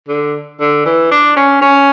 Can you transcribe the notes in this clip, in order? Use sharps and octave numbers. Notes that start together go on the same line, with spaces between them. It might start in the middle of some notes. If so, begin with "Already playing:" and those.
D3
D3
E3
D4
C#4
C#4